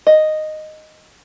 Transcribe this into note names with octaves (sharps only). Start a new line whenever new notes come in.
D#5